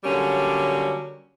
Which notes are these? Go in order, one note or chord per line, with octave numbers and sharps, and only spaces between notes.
D3 F#3 G3 A#3 C#4